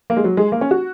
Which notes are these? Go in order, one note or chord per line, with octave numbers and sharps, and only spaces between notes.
A#3
G#3
F#3
G#3
A#3
C#4
F#4